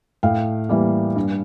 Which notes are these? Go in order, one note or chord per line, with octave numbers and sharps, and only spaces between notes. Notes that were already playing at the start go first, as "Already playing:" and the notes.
A2 F5 G5
E3 G3 A#3
G2